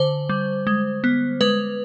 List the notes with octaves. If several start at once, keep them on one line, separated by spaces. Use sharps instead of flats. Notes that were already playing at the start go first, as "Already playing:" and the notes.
Already playing: D3 C5
G3
G#3
B3
G#3 B4